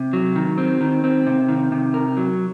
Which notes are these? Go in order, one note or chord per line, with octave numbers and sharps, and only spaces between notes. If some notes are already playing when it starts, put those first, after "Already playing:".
Already playing: C3
F#3
D#3
C4
D#3
C4
C3
D#3
C3
A#4
F#3